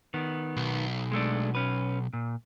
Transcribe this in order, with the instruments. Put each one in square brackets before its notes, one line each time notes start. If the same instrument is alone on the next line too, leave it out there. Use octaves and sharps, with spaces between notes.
[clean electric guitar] D#3 B3
[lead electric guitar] B1
[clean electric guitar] G#3 A3 D4
C#4 B4
A#2